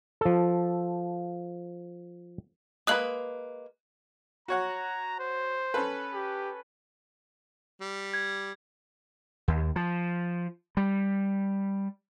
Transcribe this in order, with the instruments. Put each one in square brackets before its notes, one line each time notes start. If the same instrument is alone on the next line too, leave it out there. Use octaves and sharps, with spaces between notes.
[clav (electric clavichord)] F3 A4
[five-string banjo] G#3 A#3 B4 [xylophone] D#6 F#6 F#7
[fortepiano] F#4 C#5 F#5 [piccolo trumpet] A#5
[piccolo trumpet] C5
[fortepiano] C#4 A4 B4
[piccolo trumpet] G4
[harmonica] G3
[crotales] G#6
[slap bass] D#2
F3
G3